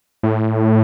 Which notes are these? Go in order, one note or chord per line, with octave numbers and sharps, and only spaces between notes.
A2